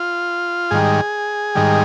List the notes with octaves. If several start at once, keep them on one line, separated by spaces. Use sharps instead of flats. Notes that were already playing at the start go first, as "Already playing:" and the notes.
Already playing: F4
G#2 D#3 G3 G#4
G#2 D#3 G3